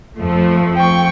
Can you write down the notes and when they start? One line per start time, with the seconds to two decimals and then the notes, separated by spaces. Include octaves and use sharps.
0.18 F2 F3 A3
0.77 G5 C#6